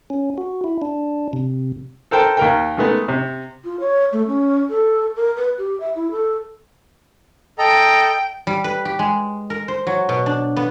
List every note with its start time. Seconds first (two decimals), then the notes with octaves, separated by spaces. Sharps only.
0.10 C#4
0.38 F#4
0.64 E4
0.82 D4
1.33 C3
2.11 A4 A#4 C5 G5 A5
2.37 D#2 A#4 G5
2.77 D#3 G#3 A3 B3
3.08 C3
3.64 F4
3.80 C#5
4.13 A3
4.27 C#4
4.70 A4
5.16 A#4
5.36 B4
5.58 G4
5.80 E5
5.95 E4
6.11 A4
7.58 A4 D#5 G5 A#5
8.47 G3
8.64 B4
8.85 G4
8.99 G#3
9.50 A#4
9.68 C5
9.87 F#3
10.09 B2
10.26 D4
10.56 B3